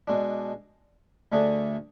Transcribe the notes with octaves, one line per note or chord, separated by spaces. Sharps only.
B2 G#3 D4
D2 D3 A3 D4 G#4